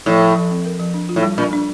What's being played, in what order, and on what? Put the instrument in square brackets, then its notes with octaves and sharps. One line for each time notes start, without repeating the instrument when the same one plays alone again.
[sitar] A2 [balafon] F3
[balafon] F3
F3
C4
A#4
F3
D4
F4
[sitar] A2
[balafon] G3
[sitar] A#2 [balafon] D4
[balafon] D4